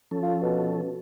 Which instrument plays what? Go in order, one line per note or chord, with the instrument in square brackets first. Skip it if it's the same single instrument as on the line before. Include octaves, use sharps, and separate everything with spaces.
[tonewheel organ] F3 C#4 A4
[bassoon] F4
B2